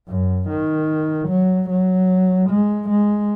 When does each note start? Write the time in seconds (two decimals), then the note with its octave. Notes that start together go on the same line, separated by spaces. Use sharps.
0.08 F#2
0.49 D#3
1.28 F#3
1.69 F#3
2.50 G#3
2.89 G#3